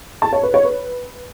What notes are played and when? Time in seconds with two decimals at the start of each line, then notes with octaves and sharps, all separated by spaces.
0.22 A5
0.33 C#5
0.43 B4
0.54 C#5
0.65 B4